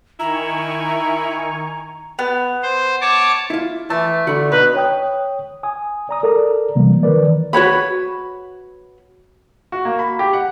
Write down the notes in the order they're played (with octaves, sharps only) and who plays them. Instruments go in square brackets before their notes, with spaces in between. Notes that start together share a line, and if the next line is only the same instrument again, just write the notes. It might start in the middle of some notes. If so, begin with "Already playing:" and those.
[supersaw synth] D#3 G#5 C#6 [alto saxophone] E4 [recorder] A#5
[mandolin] B3
[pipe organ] C5
C#5 A5 D6
[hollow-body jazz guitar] E4 F4
[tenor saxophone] E3 [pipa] A3 [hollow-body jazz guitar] A5
[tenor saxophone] D3 [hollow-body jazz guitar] F#4 B5
[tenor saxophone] B2 [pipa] D#4 [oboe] B4
[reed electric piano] C#5 G5 D#6
G#5 D#6
D5 A#5 D#6
A4 A#4 D5 A#5
C3 E3 F#3 G3 A#3
D#3 E3 A#4 B4 D5
[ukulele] F#4 B4 C#5 B5
[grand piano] F#4
A#3
B5
G4
F#5